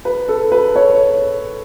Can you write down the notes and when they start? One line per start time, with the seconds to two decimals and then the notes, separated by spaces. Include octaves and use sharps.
0.05 B4
0.28 A4
0.52 B4
0.76 C#5